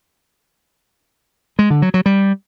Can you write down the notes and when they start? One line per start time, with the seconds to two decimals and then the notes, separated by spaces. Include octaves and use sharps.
1.59 G#3
1.70 D3
1.82 F#3
1.94 F#3
2.06 G3